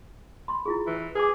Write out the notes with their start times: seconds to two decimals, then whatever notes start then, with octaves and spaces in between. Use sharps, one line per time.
0.48 B5 C6
0.66 E4 F4 G#4
0.87 E3
1.15 G#4 B4 G#5 D6